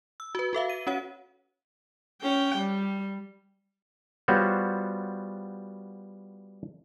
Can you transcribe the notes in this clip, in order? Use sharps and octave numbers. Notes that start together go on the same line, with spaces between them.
E6
F#4 B4
F#4 A4 E5 F5
D#7
C#4 F#4 C#5 F#5
C#4 G5
G3
G3 B3 F4 F#4 C5 C#5